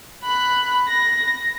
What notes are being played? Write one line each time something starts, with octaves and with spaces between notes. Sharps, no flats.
B5 F#6
A#6